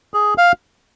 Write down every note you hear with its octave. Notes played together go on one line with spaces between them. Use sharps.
G#4
F5